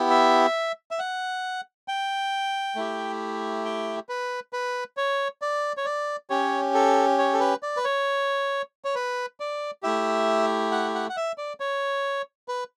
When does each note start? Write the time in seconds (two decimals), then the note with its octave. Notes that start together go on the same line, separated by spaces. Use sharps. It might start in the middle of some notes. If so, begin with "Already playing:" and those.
Already playing: B3 E4 G4
0.10 E5
0.91 E5
0.99 F#5
1.88 G5
2.76 A3 E4 G4
3.65 G5
4.09 B4
4.53 B4
4.97 C#5
5.42 D5
5.77 C#5
5.85 D5
6.30 C#4 G4 C#5
6.75 A4
7.18 C#5
7.33 A4
7.40 B4
7.63 D5
7.77 B4
7.85 C#5
8.85 C#5
8.95 B4
9.40 D5
9.83 A3 E4 G4 E5
10.72 F#5
10.95 F#5
11.09 F#5
11.17 E5
11.38 D5
11.60 C#5
12.48 B4